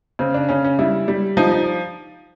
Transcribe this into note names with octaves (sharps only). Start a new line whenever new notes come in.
C#3 C4
D4
C#3 C#4
C#4
G3 E4
G3
F3 D#4
D#4